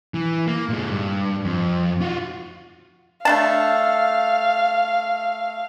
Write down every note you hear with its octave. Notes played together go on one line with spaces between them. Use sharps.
E3
A#3
A#2 G#3
G2
F2
F4 F#4
A3 D4 F5 A5